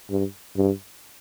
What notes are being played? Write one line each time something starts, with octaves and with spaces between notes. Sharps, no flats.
G2
G2